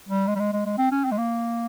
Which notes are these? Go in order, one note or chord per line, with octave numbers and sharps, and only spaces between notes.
G3
G#3
G3
G#3
G#3
G#3
C4
C#4
C4
G#3
A#3